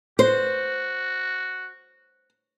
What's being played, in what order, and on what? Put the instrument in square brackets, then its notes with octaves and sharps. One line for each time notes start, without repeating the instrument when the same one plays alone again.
[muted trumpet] F#4 [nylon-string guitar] C5